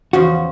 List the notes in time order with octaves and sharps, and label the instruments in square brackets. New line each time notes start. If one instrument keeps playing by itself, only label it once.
[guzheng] E2 C#3 F3 [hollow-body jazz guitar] F#4